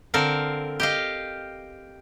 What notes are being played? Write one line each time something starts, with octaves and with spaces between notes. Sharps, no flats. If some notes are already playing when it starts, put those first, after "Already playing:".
D3 C4 A4 A#4 F5
G4 D#5 F5